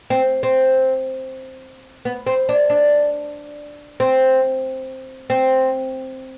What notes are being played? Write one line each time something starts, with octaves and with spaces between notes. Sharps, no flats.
C4
C4
B3
C4
D4
D4
C4
C4